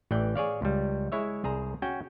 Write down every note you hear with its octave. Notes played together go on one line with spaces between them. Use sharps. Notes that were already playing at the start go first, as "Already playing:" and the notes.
A1 E3 D5 G5
G#4 C#5 D5 F5
C#2 G3
G#3 E4 C#5 E5
C2 G#4 C5 A#5
C#4 F#4 G5